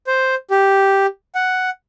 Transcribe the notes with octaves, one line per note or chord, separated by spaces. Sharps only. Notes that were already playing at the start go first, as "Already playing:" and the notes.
C5
G4
F#5